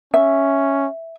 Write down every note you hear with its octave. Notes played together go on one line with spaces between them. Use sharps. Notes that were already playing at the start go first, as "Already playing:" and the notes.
C#4 E5